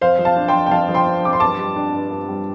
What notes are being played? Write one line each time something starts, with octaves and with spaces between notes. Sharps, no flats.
F2 C5 F5
F3
F5 A5
D4
G5 C6
F2
G5
F2 F5 A5
F3
G5 C6
D4
F2 D6
C6
G2 A5 D6
G3
D4
G2
G2
G3